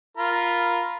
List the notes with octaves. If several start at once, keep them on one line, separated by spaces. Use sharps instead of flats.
F4 A#4 B5